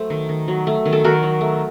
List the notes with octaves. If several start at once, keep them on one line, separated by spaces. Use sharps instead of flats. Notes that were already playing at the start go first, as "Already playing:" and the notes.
Already playing: F#3 A3 A4 C5
D#3
D#3
F#3
A3
D#3
A4
D#3 F#4 A#4
F#3
A3